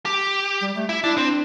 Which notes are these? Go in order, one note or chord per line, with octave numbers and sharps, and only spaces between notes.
G4
G3
A3
E4
D4 E4
C4 D4